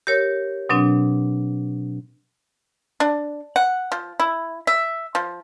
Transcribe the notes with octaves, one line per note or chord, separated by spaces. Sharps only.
G4 A#4 C#5
B2 F#3 C4 D4
D4
F#5
F3
E4
E5
F3